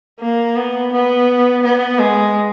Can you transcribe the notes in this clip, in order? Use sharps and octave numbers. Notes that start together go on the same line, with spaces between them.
A#3
B3
B3
B3
G#3